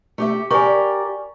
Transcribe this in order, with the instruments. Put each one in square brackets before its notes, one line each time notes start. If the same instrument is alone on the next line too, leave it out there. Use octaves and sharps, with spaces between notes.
[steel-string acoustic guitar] A3 G4 E5
[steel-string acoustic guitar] G4 A#4 D5 [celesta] G#5 C#6